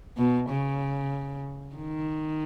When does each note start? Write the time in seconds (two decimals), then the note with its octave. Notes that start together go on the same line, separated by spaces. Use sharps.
0.17 B2
0.49 C#3
1.76 D#3